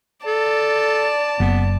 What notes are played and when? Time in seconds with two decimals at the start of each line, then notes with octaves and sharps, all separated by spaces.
0.26 A4 D5 A5
1.40 F#1 B3